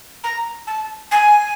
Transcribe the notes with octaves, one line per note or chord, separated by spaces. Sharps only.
A#5
A5
G#5